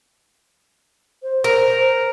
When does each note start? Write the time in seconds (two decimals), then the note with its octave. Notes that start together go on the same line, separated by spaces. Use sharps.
1.23 C5
1.44 A#4